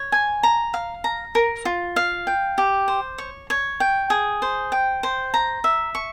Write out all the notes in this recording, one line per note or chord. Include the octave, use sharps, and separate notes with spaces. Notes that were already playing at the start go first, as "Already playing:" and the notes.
Already playing: C#5
G#5
A#5
F5
A#5
A#4
F4
F5
G5
G4
C5
C#5
C#5
G5
G#4
C5
G5
C5
A#5
E5
C#6